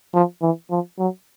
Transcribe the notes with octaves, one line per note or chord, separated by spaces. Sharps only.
F3
E3
F3
F#3